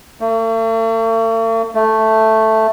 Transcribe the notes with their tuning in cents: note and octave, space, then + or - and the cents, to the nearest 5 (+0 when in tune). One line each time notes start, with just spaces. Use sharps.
A3 +45
A3 +0